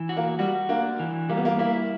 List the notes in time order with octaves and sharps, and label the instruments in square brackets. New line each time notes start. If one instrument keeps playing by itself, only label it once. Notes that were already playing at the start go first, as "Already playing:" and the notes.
Already playing: [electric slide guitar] E3
F#4
[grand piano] A#3
[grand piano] G3 [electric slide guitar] F#4
[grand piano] A#3 [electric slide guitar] D4
[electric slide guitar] E3
[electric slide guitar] G3 [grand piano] A#3
[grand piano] B3
A#3
[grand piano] A#3 [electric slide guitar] E4